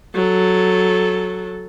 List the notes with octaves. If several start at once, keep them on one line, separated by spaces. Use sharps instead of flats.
F#3 A4